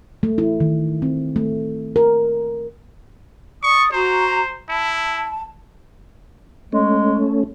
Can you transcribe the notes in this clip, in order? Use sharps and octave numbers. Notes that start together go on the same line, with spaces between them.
A3
E4
D#3
C4
A3
A#4
D5 C#6 D#6
F#4 C5 A#5
E4 A5
G#3 A3 C#4